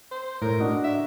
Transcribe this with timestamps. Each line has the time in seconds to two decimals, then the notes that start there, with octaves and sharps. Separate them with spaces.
0.11 C5
0.42 A2 A#4
0.60 D4 F#4 D#5
0.84 E5